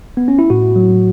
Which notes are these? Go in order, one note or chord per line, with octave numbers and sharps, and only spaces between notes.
B3
C#4
E4
A2 F#4
F#3